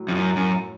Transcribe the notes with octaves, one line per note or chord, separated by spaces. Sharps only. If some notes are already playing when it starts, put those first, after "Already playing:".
Already playing: A2 F#3
F2
F#2
F#2